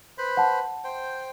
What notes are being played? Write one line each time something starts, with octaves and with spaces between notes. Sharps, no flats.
B4 C5 B5
F#5 A5
C5 G5